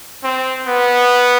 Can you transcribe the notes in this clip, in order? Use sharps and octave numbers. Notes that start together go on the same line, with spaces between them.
C4
B3